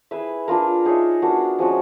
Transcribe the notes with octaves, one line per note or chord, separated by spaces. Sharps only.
E4 G#4 B4 E5
A#3 D4 F4 A#4
D#4 G#4 C#5 E5
B3 D4 F#4 A#4
F3 G#3 C#4 F#4